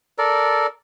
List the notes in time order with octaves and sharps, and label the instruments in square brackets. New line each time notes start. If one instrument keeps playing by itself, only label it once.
[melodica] A4 A#4 D5